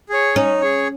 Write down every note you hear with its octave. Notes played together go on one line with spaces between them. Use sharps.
G#4 C#5
C#4 D#4
G#4 C#5